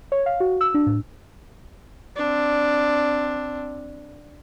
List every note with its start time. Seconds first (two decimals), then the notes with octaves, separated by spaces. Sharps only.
0.12 C#5
0.26 F5
0.40 F#4
0.61 E6
0.74 D4
0.86 A2
2.16 C4 D4